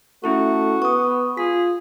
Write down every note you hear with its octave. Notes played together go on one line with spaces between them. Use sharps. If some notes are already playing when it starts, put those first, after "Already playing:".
A3 C#4 E4 F#4 A4
B3 C#6 D#6
F4 G#4 B6